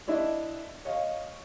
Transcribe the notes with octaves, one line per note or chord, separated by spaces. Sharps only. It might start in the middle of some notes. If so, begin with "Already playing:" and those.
D4 E4 D#5 E5
C#5 D#5 F5